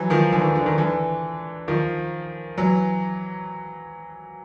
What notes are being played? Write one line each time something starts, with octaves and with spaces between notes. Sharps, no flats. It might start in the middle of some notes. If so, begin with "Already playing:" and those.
Already playing: E3 F#3
D#3 F3
D3 E3
D#3
D3
D#3
D3 E3
D#3 F3
E3 F#3